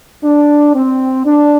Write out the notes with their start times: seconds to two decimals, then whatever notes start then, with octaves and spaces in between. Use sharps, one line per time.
0.22 D4
0.73 C4
1.24 D4